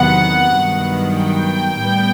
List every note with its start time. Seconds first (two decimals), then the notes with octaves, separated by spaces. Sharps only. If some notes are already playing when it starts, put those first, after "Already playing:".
Already playing: E2 C3 D#3 F#3 B3 F#5
0.56 G2 D#3 F#3 B3
1.16 G5
1.77 A2 G3 B3